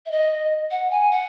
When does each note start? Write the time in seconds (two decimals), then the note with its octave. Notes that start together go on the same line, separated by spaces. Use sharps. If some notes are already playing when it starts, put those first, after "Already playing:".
0.06 E5
0.11 D#5
0.71 F#5
0.91 G#5
1.11 F#5